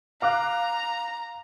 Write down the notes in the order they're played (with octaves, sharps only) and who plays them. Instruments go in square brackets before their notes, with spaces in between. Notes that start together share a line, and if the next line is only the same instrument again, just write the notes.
[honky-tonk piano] F5 D6 F#6 [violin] A#5